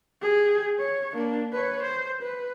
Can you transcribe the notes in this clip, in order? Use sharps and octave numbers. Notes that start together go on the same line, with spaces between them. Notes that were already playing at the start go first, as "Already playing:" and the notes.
G4 G#4
C#5
A#3 D4
B4 C#5
C5
B4